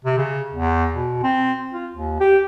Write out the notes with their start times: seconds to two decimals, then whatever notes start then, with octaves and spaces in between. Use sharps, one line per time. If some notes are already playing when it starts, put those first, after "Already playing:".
0.05 C3
0.18 C#3
0.53 E2
0.94 B2
1.23 C4
1.72 F4
1.95 D#2
2.20 G4